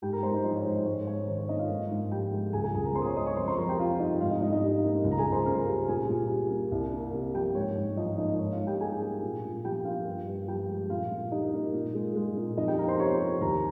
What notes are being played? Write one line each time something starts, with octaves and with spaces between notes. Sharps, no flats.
G#2 G4 G5
A#4 A#5
G#2 C5 C6
D#4 D#5
F3 D#4 D#5
C#5
G#3 C5
C5
G#2 C#5
G#2 C#5
D#3 C5
C#5
A#3 D#4 D#5
F4 F5
G#2
G#2
F3 G4 G5
G#3
C#2 G#4 G#5
G#4 G#5
C#2 G#4 G#5
A#4 A#5
C#3 C5 C6
D#6
C#5 C#6
G#3 D#5 D#6
C#5 C#6
F2 C5 C6
C5 C6
F2 A#4 A#5
G4 G5
C3 F4 F5
G3 D#4 D#5
G#2 F4 F5
D#4 D#5
G#2 D#4 D#5
D#4 D#5
G3
A#3
C#2
A#5
G#4 G#5
C#2
C5 C6
C#3 A#4 A#5
G3
A#2 G#4 G#5
A#2
G3
A#3
C2
A#3
C3
F3 G4 G5
G#2 C#5
G#2
F3 D#4 D#5
A#3 D#4 D#5
G#2 C#5
F4 F5
G#2
G4 G5
G3 G#4 G#5
A#3
A#2
A#2
F3 G4 G5
A#3 F4 F5
G2
G2
F3 G4 G5
G#3
A#2 F4 F5
A#2
G3 D#4 D#5
A#3
A#2
G#3
G#3
A#2
F2 D#4 D#5
G4 G5
A#3 A#4 A#5
C5 C6
C3 C#5 C#6
G3
D#2 A#4 A#5